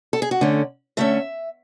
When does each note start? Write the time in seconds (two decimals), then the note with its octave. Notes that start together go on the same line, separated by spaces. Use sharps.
0.13 A4
0.22 G#4
0.31 F#4
0.41 D3 A3 C#4
0.97 D3 A3 C#4 E5